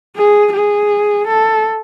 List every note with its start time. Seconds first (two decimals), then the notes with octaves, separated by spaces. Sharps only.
0.16 G#4
0.53 G#4
1.28 A4